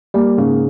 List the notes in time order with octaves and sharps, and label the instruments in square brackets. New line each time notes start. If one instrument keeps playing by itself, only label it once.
[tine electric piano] G3 [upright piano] A#3
[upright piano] G#2 [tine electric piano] C#3